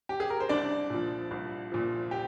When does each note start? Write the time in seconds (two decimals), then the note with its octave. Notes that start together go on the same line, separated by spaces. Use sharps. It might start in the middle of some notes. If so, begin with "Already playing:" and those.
0.09 G4
0.20 G#4
0.30 A#4
0.40 C5
0.49 C2 D4 D5
0.90 A#2 F3
1.31 C2
1.72 A#2 F3
2.11 G4